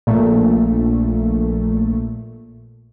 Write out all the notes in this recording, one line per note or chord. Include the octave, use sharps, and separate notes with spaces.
A#1 A#2 A3